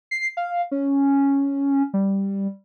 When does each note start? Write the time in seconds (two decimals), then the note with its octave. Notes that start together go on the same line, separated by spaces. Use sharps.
0.11 C7
0.37 F5
0.71 C#4
1.94 G3